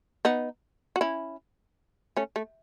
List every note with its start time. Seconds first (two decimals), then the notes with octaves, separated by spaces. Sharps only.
0.25 B3 D#4
0.96 F#4
1.01 C#4 E4
2.17 A3 C#4
2.36 A3